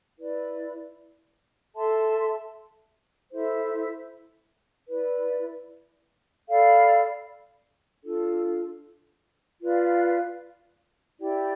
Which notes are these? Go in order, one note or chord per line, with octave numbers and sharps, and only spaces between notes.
E4 B4 D5
A4 E5 A5 C6
E4 A4 C5 E5
E4 B4 D5
A4 D5 F5 B5
D4 F4 A4
F4 B4 D5 F5
E4 G4 D5 G5